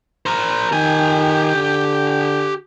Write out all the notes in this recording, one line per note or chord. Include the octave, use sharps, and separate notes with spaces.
A#4 C5
D#3 G4 G#5
D3